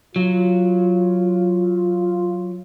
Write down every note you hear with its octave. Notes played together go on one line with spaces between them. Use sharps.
F#3 F4